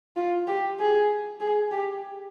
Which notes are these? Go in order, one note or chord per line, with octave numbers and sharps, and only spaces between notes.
F4
G4
G#4
G#4
G4